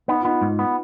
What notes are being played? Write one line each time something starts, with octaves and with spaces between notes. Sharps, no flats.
B3 D#4
F4
B3 D#4
G#2
B3